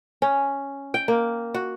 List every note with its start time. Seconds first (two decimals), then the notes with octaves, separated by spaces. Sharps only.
0.22 C#4
0.94 G5
1.08 A#3
1.54 F#4